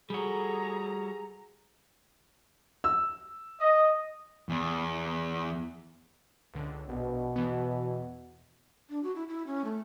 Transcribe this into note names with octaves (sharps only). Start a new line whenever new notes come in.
G3 F#4 G#4 A4 A#5
E6
D#5
E2
C#2 D3
A#1 B2
E2 E3 B3
D4
F#4
E4
E4
C#4
A3